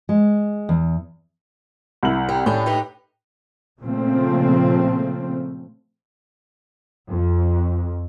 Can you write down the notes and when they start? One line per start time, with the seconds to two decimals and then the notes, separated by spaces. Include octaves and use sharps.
0.09 G#3
0.69 E2
2.03 C2 E4 F#7
2.29 G3
2.46 A2 C#4 D4 G4
2.66 D#4 G4 B4
3.82 A#2 C#3 F3 A3 C4
7.08 F2